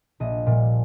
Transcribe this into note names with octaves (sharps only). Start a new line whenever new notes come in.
A#1 D#5
A#2 G3